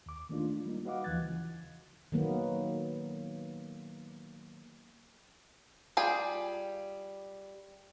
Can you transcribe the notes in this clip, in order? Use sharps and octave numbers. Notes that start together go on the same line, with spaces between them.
D#2 D6
D#3 A3 A#3 D4 D#4 F4
G3 A#3 D#4
F#4 B4 D#5 F5 F#5 D6
D#2 E3 F3 F#6 G#6 A6
C#3 E3
D#3 F#3 A#3 B3
G3 F4 G#4 G5 G#5